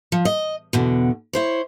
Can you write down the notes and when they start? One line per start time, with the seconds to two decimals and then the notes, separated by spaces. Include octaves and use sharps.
0.12 F3
0.25 D#5
0.73 E2 B2 D3
1.33 E4 C5 C#5